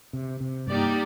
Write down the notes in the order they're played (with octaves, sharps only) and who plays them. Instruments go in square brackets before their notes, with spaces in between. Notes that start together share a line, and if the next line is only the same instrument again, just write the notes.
[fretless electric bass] C3
C3
[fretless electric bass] G2 [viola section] A#3 D#4 G4 D5